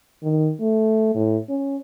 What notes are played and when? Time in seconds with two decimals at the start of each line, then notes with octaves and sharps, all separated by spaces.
0.23 D#3
0.60 A3
1.15 A2
1.49 C#4